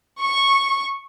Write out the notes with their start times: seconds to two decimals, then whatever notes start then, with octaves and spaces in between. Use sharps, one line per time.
0.21 C#6